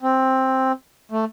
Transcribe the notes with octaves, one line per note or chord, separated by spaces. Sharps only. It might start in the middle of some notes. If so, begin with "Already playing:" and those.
C4
A3